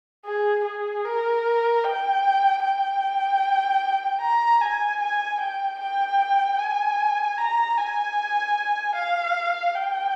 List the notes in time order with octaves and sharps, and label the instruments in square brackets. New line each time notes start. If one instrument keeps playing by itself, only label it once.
[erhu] G#4
G#4
A#4
G5
G5
A#5
G#5
G#5
G5
G5
G#5
A#5
G#5
F5
G5